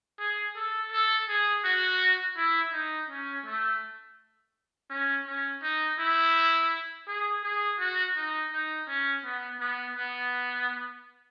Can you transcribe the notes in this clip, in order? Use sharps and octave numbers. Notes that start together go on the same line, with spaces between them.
G#4
A4
A4
G#4
F#4
E4
D#4
C#4
A3
C#4
C#4
D#4
E4
G#4
G#4
F#4
D#4
D#4
C#4
B3
B3
B3